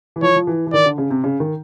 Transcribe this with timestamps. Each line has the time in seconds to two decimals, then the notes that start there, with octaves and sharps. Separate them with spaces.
0.16 E3
0.22 F3 C#5
0.36 F3
0.47 E3
0.67 E3
0.74 D#3 D5
0.86 D3
0.98 C#3
1.10 C3
1.24 C#3
1.40 D#3